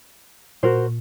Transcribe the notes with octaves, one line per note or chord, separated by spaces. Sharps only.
A#2 F#4 A#4 C5